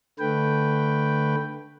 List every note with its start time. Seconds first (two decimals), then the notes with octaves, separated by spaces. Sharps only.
0.19 D3 A3 B4 G5